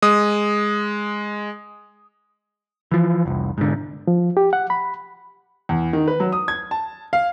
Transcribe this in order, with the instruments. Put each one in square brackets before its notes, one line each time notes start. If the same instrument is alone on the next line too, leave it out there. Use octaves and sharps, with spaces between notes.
[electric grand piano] G#3 D#6
[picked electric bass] E3 F3
F1 C2
G#2 D3
[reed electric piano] F3
G4
F#5
B5
[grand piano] E2
D#3
B4
F#3
D#6
G#6
A5
F5